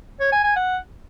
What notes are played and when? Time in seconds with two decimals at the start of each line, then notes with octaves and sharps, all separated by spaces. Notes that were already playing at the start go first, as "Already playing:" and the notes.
0.20 C#5
0.32 G#5
0.44 G#5
0.56 F#5